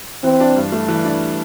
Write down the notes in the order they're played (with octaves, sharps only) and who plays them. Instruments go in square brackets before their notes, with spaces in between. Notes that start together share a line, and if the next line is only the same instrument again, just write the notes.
[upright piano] E3 [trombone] C4
[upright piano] D4
G2
A3
E3
D4